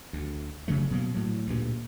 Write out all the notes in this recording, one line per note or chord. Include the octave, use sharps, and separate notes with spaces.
D2
F#1 C#3 F#3 A3
B2 F#3 A#3
A2 F#3
D2 G2 A#2